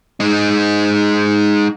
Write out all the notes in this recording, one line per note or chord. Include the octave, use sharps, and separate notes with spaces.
G#3 D#4